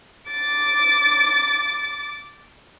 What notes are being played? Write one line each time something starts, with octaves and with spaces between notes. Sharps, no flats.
D6 A6